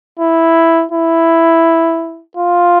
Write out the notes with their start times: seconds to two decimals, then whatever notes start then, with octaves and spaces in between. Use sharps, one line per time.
0.20 E4
0.92 E4
2.37 F4